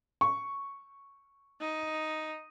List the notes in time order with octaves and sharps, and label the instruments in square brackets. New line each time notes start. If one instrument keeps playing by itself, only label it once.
[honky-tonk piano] C#6
[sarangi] D#4